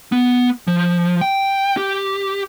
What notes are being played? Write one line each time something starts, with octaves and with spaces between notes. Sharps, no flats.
B3
F3
G5
G4